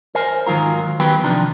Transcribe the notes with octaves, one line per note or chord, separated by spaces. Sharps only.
A#4 C5 G#5
G#2 D#3 F#3 F4 A#4
D#3 F#3 B3 G4 B4 G5
C3 D#3 F3 D4